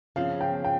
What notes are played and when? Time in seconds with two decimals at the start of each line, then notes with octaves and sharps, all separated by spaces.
0.16 C#3 F3 C4 F5
0.41 G5
0.64 G5